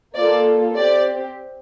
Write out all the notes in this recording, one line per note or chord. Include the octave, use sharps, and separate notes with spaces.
A#3 F4 A4 D5
C4 G4 D5